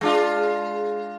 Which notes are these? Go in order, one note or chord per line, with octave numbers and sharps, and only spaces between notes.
G#3 D4 F4